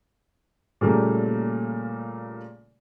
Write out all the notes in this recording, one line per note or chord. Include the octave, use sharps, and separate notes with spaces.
A#2 C#3 G3 A3 A#3